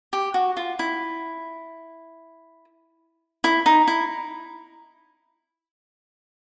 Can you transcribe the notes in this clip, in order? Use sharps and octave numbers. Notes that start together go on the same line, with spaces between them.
G4
F#4
F4
E4
E4
D#4
E4